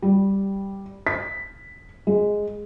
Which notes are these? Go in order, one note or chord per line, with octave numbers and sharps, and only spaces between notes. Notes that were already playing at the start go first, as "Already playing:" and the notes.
G3
B6
G#3